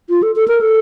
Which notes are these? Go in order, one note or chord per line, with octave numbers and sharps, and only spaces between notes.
F4
A4
A4
A#4
A4